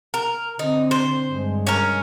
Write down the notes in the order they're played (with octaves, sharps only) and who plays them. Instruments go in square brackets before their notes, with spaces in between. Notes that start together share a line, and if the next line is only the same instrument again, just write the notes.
[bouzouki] A#4
[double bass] D3 C4 [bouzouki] D#4
[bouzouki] C5
[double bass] G2 G#3
[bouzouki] C#4 A#4